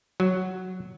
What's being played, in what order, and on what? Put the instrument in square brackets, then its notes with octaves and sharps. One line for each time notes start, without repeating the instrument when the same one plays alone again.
[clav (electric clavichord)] F#3